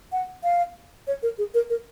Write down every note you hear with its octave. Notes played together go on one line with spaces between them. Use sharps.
F#5
F5
C#5
A#4
G#4
A#4
A#4